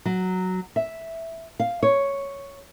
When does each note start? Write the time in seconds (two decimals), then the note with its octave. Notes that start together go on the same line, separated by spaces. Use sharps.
0.06 F#3
0.76 E5
1.60 F5
1.83 C#5